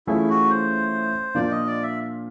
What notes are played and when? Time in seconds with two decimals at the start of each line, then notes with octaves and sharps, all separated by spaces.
0.07 E3 A3 C#4 E4 F4 G#4
0.29 F#4
0.50 C5
1.35 A#2 F3 A#3 D4 F4 D5
1.51 D#5
1.67 D5
1.83 E5